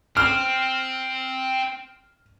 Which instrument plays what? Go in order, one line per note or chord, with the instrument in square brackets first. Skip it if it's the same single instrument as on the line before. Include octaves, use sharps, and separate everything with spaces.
[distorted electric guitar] C4 [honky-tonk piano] F6